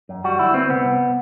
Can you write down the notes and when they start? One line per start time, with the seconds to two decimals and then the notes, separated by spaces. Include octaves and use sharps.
0.09 F#2
0.24 G3 F#4
0.39 D2 E4
0.54 B3 C4
0.69 C2 B3
0.84 C2